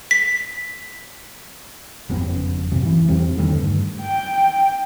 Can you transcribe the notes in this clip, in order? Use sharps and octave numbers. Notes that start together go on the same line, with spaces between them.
B6
F#1 F2 B3 C#4
F#2 C3
E3
E2 G3 C4
D3 D#3 A3 B3
G2
G5